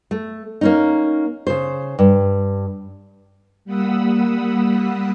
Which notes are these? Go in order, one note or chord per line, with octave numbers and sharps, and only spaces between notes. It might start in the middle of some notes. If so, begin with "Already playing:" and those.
A3
A#3 C#4 D#4
C#3 C5
G2
G3 A#3 F#5 B5 D#6 E6